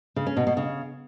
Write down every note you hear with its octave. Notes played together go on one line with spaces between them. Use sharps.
C#3
C#4
B2
B2
C#3